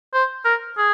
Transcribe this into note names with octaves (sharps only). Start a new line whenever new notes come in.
C5
A#4
G#4